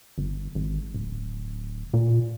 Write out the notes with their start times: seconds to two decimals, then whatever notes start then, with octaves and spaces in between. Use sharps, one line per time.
0.18 G1
0.55 G#1
0.94 D1
1.93 A#2